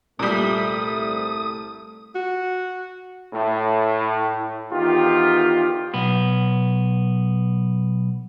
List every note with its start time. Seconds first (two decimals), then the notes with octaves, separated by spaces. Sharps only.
0.19 C2 A#2 G3 A3 D#6
2.15 F#4
3.32 A2
4.71 E2 D#3 F4 G4
5.94 B1 B3